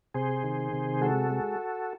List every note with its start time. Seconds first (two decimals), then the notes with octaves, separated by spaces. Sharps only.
0.14 C3 G#4 C5
0.43 D#3
0.73 C3
1.01 G#3 F#4 A4
1.30 G#3